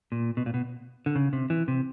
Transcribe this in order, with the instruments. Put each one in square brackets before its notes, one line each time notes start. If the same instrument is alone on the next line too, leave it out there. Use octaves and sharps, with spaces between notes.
[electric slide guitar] A#2
B2
A#2
B2
D3
C#3
C3
E3
C3